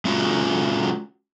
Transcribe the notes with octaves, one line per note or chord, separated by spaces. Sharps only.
G#3 C#4 F4 F#4